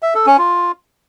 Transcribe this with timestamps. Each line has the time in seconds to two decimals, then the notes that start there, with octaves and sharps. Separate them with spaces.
0.03 E5
0.14 A4
0.26 C#4
0.38 F4